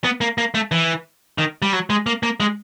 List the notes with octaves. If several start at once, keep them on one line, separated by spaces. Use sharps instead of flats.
B3
A#3
A#3
A3
E3
D#3
G3
F#3
G#3
A#3
A#3
G#3